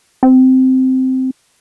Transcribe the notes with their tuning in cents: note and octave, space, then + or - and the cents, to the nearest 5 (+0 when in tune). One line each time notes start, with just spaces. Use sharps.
C4 -10